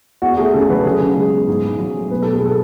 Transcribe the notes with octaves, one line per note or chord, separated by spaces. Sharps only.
E2 F#4
A3 G#4
C#3 A4
F#3 B4
C#3 G#4
C#3
G#3
B3
G#2
G#2
F#3
A3
B2 B4
B2 A4
G#4
F#3 A4